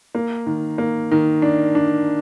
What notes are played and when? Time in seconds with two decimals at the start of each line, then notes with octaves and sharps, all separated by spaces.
0.15 A#3
0.46 D#3
0.78 A#3
1.11 D#3
1.42 D4
1.75 D4